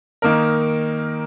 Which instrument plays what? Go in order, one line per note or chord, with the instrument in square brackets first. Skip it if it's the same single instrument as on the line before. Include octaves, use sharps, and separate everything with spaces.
[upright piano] D#3 A#3 D#4 A#4